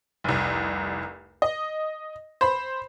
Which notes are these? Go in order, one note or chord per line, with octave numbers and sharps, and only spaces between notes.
F1 C2
D#5
C5 B5